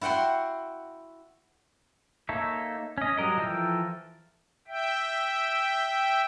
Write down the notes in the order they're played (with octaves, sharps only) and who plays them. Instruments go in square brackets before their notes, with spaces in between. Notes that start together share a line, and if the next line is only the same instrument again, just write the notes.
[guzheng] E4 F#4 F#5 G5 C6
[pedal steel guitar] A#3 D#4 A4 C#5 E5
C#4 D#5
F#3 G3 A#4 D#5
E3 F3 A4 A#4 G5
[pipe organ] E5 G5